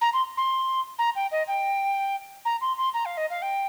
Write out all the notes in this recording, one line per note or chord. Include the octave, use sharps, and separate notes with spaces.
A#5
C6
C6
A#5
G5
D#5
G5
A#5
C6
C6
A#5
F5
D#5
F5
G5